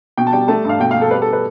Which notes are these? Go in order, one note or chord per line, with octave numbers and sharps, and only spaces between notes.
B2 G5
A5
G3 G5
A3 A5
G2 F5
B2 G5
F5
B2
A4
G3 B4
A4
B4